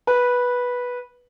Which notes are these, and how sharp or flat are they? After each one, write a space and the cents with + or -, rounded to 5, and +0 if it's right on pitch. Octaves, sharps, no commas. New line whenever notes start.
B4 -10